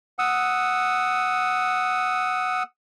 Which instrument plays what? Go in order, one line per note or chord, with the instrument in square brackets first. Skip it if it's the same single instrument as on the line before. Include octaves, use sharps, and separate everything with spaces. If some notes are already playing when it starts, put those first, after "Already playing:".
[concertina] F#5 D#6 E6